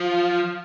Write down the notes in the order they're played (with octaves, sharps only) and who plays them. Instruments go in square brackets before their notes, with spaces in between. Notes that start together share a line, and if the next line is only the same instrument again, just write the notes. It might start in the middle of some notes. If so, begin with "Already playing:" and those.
Already playing: [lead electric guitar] F3